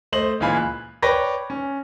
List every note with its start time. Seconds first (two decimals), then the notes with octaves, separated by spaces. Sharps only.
0.12 A3 C5 D#5 F#7
0.40 C#2 A#2 E3 F4 G#5 B5
0.57 F#6
1.02 B4 C#5 D5 G5 A#6
1.50 C#4